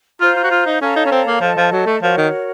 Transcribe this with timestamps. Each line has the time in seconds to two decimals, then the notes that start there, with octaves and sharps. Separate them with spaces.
0.20 F4 C5 F5 A#5
0.36 F4
0.44 F#4
0.51 F4
0.66 D#4
0.81 C#4 A4 C#5 F5 A#5
0.96 D#4
1.06 C#4
1.12 C4
1.27 A#3
1.41 F3 A4 D#5 A5
1.57 F3
1.72 F#3
1.86 A3
2.02 F3 F#4 A#4 C#5
2.18 D#3